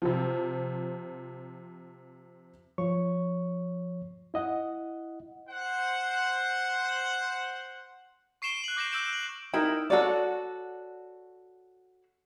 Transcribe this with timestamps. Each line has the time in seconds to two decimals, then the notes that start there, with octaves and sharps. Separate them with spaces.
0.02 C3 F3
2.78 F3 C#5 C#6
4.34 E4 D#5 F#5
5.49 C5 F#5
8.42 C#6 C7 D7 E7 G7
8.64 F#6 F#7
8.77 D6 G6 A#6 C7 D7 E7
8.92 D6 E6 G6 D7 E7 F#7
9.13 F#7
9.54 D#4 E4 A#4 G5
9.90 F#4 A4 C#5 D5